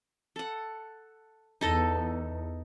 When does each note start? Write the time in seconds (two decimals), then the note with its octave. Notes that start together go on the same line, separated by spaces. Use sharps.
0.36 A4 F#5
1.61 E2 D#4 A4 D#5